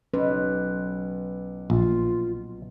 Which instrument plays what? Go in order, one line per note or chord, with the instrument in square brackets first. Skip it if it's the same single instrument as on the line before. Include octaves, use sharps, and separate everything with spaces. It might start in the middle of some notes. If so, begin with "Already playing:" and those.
[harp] B1 [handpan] C#4 B4
[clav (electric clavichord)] A#1 [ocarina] F4